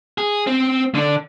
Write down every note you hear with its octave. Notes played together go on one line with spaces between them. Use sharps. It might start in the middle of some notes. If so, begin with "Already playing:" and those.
G#4
C4
D3 D4